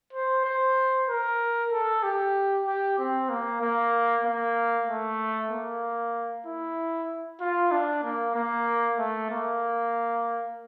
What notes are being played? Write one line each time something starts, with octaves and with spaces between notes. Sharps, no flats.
C5
C5
A#4
A4
G4
G4
C4
A#3
A#3
A#3
A3
A#3
E4
F4
D4
A#3
A#3
A3
A#3